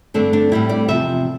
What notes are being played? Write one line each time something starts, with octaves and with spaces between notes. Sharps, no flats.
G2 D3 A3 C4 D4
D4
A2 G3 C4 E4
D5
E2 C3 F3 E5